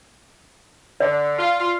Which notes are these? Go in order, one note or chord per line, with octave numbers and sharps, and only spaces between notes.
D3 D5
F4
F4